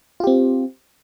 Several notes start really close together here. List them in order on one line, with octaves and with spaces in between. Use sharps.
F4 G4 C4